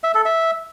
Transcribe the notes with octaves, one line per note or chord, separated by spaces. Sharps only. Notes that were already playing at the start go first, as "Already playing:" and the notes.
E5
A4
E5